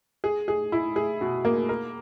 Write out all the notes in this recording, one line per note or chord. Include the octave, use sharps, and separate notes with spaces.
G#4
G#4
E4
G#4
B2
A#3
A#4